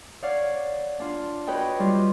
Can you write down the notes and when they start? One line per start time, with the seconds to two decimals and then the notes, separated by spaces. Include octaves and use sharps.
0.23 C#5 D5 F5 F#5
1.00 D4 F4
1.47 F#4 B4 C#5 D#5 G5
1.79 G3 F4